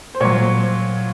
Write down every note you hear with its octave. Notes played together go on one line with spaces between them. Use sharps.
C5
A#2 F#3 C#5